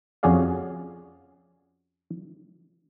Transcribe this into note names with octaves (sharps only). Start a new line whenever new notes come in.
F2 C#4 F#4 G#4 D5 F5